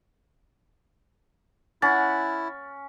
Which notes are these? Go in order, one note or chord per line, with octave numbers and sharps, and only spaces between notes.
C#4 E4 F#5 A6